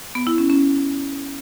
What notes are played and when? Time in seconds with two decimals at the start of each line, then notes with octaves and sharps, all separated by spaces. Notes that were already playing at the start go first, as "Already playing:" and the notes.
0.15 B3
0.27 E4
0.38 C#4
0.50 C#4